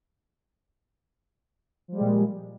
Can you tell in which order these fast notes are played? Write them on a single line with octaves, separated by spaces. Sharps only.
F3 G3 G#3 A#2